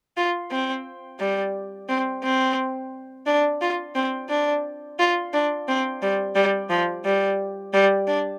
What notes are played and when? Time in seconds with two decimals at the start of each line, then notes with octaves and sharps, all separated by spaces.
0.17 F4
0.51 C4
1.19 G3
1.88 C4
2.23 C4
3.26 D4
3.61 F4
3.95 C4
4.29 D4
4.99 F4
5.33 D4
5.68 C4
6.02 G3
6.35 G3
6.70 F3
7.05 G3
7.73 G3
8.08 D4